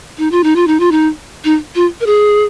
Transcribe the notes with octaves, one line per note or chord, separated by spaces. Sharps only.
D#4
F4
D#4
F4
D#4
F4
D#4
D#4
F4
A#4
G#4